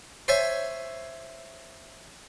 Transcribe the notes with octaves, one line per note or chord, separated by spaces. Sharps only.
C5 C#5 E5 G#5 C#6